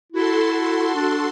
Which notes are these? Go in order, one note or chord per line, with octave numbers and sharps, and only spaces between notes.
E4 F#4 A4 C6
D4